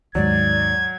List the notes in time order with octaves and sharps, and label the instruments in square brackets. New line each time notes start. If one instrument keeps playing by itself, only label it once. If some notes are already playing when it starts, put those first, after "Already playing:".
[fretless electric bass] D#2 G#2 [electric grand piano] F#3 [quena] D5 [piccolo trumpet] G#6